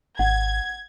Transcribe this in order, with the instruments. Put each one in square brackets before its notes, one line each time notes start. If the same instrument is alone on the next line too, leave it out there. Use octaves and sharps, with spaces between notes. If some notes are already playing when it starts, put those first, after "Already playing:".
[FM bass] G#1 [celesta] F#5 [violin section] G#6